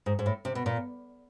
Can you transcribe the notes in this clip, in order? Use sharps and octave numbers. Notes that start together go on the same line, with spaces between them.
G#2
G#2
A2
C3
B2
A#2